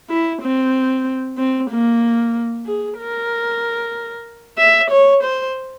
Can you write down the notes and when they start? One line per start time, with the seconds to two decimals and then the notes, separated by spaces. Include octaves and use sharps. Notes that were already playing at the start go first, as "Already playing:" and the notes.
0.10 E4
0.42 C4
1.38 C4
1.70 A#3
2.66 G#4
2.99 A#4
4.58 E5
4.91 C#5
5.23 C5